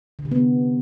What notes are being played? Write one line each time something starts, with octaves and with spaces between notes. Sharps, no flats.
D3
C3
B3